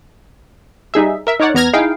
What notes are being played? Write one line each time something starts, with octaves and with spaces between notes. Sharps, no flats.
G3 D#4 G#4 E5
A#4 E5
D#4 A#4 C#5 D5 F#5
E2 B3 A#5 F6 G#6 A#6
D#4 E4 G#4 F5 G5